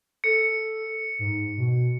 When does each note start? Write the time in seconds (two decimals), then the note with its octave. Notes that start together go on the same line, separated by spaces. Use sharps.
0.24 A4 C#7
1.19 G#2
1.57 B2